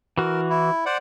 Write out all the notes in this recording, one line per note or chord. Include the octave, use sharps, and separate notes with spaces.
E3 F#4 A#4
E4
C5 D5 F#5